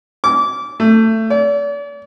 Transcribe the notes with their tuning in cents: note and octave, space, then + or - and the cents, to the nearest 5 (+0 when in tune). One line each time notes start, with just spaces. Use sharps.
D6 -25
A3 +20
D5 -40